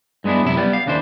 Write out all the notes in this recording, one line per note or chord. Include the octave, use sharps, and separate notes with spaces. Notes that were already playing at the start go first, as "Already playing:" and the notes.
G2 G#3 B3 D4 E4
F#2 C3 E4
G3 B3
F5
D#2 C#3 D4 E4 C5